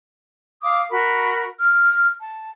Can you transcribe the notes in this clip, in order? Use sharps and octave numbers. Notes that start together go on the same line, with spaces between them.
F5 D6 D#6
F#4 A#4 B5
F6
A5